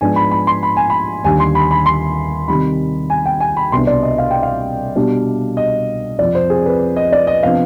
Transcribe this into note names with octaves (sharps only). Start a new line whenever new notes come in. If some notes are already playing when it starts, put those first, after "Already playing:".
G#2 F3 G#3 B3 D4 G#5
B5
B5
C6
B5
G#5
B5
D#2 D3 G3 G#5
C6
B5
B5
C6
C3 D#3 G3 B5
G#5
G5
G#5
B5
C2 B2 B3 D4 C6
D5
D#5
F5
G5
F5
B2 G3 D4
D#5
F2 C3 F3 C4 D5
C5
G#4
B4
D#5
D5
D#5
C3 F3 B3 D4 F5